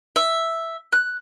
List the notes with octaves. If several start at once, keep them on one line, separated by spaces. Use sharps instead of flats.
E5
F#6